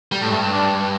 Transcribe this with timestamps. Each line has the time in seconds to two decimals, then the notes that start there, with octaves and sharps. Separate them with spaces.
0.12 G3
0.22 A2
0.31 G2 A3
0.52 D4